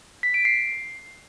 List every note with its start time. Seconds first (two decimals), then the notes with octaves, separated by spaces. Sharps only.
0.23 B6
0.34 D7
0.45 C7